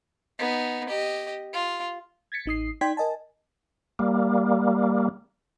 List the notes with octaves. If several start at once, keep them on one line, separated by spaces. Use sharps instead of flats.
B3 D#4
G4 D#5
F4
G#6 A6 B6 C#7
A1 D#4 D#6 C7
D#4 D5 G5 C6 G#6 B6
A#4 D#5 G#5 A5
G3 A#3